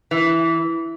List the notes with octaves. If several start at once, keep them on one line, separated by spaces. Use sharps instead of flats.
E3